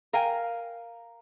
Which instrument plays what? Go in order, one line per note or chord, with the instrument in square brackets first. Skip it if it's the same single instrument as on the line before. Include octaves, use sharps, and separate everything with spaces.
[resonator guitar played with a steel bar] A#4 F5 G5 G#5